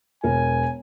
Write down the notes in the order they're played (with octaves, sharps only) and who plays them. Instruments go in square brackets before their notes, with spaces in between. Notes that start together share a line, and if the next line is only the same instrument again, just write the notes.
[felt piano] E1 A#4 [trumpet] G#5